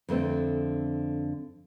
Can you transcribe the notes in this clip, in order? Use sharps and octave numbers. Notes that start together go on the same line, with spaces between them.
F2 D3 A3 C4